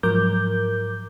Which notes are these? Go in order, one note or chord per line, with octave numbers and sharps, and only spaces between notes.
G#2 F3 F#3 A#4 D6 G6